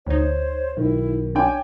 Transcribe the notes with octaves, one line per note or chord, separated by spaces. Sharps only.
D2 D#4 C5 C#5
B1 D#3 E4
D4 C#5 G5 G#5